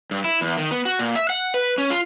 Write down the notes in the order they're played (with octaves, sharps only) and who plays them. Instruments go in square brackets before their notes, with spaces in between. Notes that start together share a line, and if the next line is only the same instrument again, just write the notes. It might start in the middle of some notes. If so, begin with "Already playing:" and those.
[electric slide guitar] G2
E4
E2
D#3
B3
F#4
A#2
E5
F#5
B4
C#4
F4